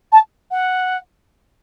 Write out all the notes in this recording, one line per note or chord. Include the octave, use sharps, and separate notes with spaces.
A5
F#5